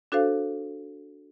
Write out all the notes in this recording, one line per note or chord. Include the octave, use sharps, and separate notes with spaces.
D4 F#4 A4 C5 F5